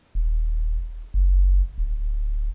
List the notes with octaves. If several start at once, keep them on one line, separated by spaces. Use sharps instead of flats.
D#1
F#1
D1